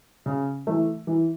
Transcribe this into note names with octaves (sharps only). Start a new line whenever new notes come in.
C#3
E3 A3
E3